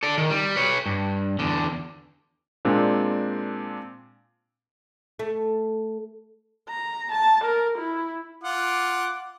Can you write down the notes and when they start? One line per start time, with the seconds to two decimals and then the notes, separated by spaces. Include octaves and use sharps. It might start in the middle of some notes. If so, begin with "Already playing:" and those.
0.03 A4 D5
0.18 D#3
0.30 G3
0.56 B4 C#5
0.86 G2
1.39 E2 D3
2.65 A#2 G#3 C4 D4
5.19 A3
6.69 A#5
7.12 A5
7.44 A#4
7.78 E4
8.44 F4 F#5 D6